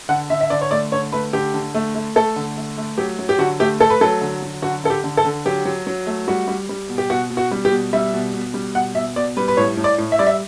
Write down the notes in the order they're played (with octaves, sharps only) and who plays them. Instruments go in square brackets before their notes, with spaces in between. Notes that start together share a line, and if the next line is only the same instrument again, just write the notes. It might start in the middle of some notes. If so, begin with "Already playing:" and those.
[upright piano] D3 F#5
D3 E5
E5
D3 D5
C#5
A3 D5
D3 C#5
A3 B4
D3 G4
D3
A3
A3
A3 A4
D3
A3
A3
F#3 G4
F#3
G4
D3 F#4
A3 G4
A3 A4
B4
F#3 A4
D3
F#3
D3 F#4
D3 A4
G4
D3
A4
D3
F#3 G4
F#3
F#3
A3
G3 F#4
G3
G3
B2
G4
B2 F#4
B2
F#4
G3
G4
B2
G3 E5
B2
B2
G3
B2 F#5
B2 E5
B2 D5
G3 B4
B4
A2 C#5
A2
D5
A2
E5
G3 D5
E5